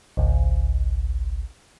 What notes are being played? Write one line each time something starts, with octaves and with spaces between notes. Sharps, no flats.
G#1 C#2